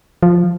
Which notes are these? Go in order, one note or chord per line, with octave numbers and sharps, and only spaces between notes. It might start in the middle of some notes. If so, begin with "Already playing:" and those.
F3